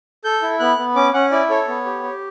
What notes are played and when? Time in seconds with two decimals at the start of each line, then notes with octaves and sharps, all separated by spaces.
0.24 A4 G6
0.42 E4
0.60 B3 F#6
0.79 B3
0.95 C#4 D6
1.13 C#4 F#5
1.31 E4 D5
1.50 A4 C#5
1.68 B3
1.86 G4
2.03 G4